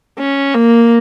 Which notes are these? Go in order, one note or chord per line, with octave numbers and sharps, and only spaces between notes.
C#4
A#3